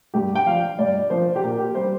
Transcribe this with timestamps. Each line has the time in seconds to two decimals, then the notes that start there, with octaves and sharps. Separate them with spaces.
0.14 G2 G4
0.35 G5
0.46 F3 D4 F5
0.79 G2 D5
1.10 F3 D4 C5
1.36 G4
1.43 A#2 A#4
1.59 G4
1.75 G3 D4 C5